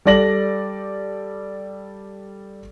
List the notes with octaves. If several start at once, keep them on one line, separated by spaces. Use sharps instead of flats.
G3 A4 D5 A#6 F#7